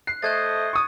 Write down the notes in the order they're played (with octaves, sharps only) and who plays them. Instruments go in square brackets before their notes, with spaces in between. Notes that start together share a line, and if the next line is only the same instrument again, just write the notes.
[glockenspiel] F#6 [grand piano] C7
[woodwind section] A3 C5 D#5 [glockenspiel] F#6 G#6 A6
[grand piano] C#6 D#6